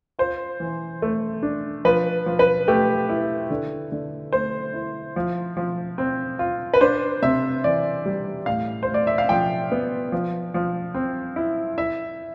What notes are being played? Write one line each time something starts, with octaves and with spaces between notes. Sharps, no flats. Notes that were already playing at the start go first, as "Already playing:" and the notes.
F4 C5
E3
A3
D4
F3 B4
F3
B4
A3 G4
E4
D3
D3
A3 C5
E4
F3
F3
C4
F4
B4
D4 C5
C3 E5
E3 D5
G3
A2 F5
C5
A2
D5
E5
F5
F3 G5
B3
F3
F3
C4
E4
E4 E5